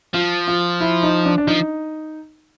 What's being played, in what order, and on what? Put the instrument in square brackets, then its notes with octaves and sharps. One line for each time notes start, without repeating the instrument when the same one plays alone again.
[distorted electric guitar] F3 [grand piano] F4
[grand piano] F4
E4
D#4
D4
D4
[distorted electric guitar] F3 [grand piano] D#4